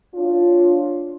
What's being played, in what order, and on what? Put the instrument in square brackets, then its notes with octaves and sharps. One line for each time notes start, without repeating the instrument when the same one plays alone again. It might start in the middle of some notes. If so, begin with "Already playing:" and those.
[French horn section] D4 F4 C#5